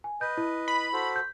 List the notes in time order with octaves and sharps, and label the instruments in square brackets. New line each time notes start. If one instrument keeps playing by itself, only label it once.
[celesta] G#5
[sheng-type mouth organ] B4 D#5 [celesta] G6
[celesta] E4
[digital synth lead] B5
[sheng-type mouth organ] F#4 A4 C5
[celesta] G6